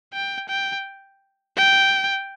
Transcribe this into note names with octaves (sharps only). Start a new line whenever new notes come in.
G5
G5
G5